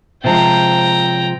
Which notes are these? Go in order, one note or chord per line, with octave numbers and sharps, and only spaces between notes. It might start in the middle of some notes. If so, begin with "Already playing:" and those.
C3 F3 G#3 G5 A#5